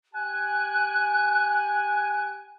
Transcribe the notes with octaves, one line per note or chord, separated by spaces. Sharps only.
G4 G5 G#5 F#6